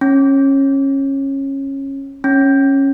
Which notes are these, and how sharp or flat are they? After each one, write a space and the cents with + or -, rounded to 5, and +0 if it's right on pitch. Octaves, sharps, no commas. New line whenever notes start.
C#4 -20
C#4 -15